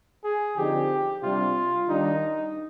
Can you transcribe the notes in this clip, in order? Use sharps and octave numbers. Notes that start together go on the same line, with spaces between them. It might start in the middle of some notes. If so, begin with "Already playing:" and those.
G#4
D3 F3 C4 D#4 G4
C3 G3 D4 F4
D#3 G3 D4 D#4